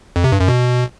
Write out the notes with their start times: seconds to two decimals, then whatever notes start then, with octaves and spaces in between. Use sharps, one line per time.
0.16 F2
0.24 C3
0.32 G2
0.40 F#2
0.48 B2